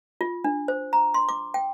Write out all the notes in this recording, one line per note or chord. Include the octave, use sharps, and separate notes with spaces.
F4
D4
C5
A#5
C6
D6
G5